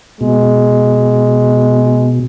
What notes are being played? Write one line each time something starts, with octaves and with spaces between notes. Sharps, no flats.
B2 G#3